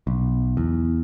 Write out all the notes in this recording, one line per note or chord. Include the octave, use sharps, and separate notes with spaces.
B1
E2